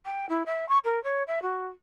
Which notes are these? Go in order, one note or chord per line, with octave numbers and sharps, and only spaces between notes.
G5
E4
E5
C#6
A#4
C#5
E5
F#4